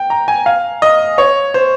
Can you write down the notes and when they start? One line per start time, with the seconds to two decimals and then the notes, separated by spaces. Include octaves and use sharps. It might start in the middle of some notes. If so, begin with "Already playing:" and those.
Already playing: G5
0.10 A#5
0.28 G#5
0.46 F5
0.82 D#5
1.18 C#5
1.54 C5